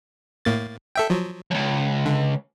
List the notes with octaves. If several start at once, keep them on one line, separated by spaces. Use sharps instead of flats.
A2 A#3 A6
A4 E5 G5
F3 F#3
C#2 F#2
D3